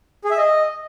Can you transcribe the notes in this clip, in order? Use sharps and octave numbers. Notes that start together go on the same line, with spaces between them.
G#4
E5
D#5